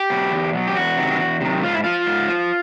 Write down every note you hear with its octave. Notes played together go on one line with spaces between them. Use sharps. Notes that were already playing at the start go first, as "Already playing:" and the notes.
Already playing: G4
B2 F#3
E2
B2 F#3
G4
E2 F#4
C3 D#3 F#3
E2
C3 D#3 F#3
G#2 F4
E4
F3 F4
G#2
F3